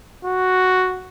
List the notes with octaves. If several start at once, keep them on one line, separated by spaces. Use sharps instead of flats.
F#4